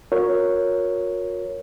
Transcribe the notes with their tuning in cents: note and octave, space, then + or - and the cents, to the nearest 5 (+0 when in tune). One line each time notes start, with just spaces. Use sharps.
F#4 -45 A#4 +0 C#5 +0